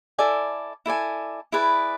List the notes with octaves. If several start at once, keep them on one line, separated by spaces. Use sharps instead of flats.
E4 A4 D5 G#5
E4 A4 D5 G#5
E4 G#4 B4 D5